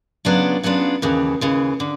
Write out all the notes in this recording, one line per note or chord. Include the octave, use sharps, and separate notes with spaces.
C#3 F#3 B3 D4 F4
C#3 F#3 B3 D4 F4
D#2 C#3 E3
D#2 C#3 E3
D3